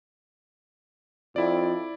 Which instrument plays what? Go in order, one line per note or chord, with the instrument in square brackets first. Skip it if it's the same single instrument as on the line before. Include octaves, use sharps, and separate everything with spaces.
[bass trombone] F2 [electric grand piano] E4 D5